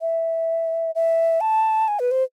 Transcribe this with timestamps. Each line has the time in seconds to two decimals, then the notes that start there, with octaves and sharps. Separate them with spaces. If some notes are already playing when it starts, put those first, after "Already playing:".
0.01 E5
0.95 E5
1.41 A5
1.88 G#5
1.99 B4
2.11 C5